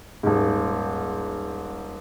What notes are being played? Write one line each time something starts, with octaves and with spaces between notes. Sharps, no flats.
D#1 G#2